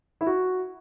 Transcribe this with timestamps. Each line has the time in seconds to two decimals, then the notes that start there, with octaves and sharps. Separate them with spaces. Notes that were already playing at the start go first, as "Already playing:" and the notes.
0.21 E4
0.27 F#4